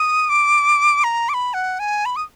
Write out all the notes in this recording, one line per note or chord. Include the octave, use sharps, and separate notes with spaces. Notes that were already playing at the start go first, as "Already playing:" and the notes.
Already playing: D#6
D6
A#5
D6
B5
F#5
G#5
B5
D#6